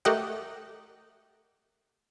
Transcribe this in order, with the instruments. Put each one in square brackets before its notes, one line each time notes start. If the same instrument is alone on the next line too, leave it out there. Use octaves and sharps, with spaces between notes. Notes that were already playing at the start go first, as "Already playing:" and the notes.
[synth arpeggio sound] A3 G4 A#4 D#5 F#5 G5